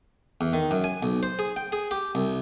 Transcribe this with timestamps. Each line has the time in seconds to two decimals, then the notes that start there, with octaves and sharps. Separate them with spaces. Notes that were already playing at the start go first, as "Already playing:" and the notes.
0.41 E2
0.53 D#3
0.71 F#2
0.84 G#5
1.03 B1
1.23 C5
1.39 G#4
1.56 G5
1.72 G#4
1.91 G4
2.15 C2